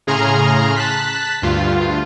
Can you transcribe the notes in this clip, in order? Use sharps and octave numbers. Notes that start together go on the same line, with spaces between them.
A2 C#3 G#4 A#5 C6 F6
A5 F#6 B6
D2 G2 F4